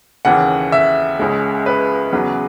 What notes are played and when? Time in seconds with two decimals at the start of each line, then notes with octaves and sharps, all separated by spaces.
0.25 D#2 C#3 E3 F#5
0.72 E5
1.19 C#2 C#3 G#3
1.66 B4
2.13 E2 C#3 F#3